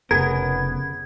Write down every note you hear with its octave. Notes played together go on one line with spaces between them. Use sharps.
F1 C#3 B3 G#4 A#4 G#6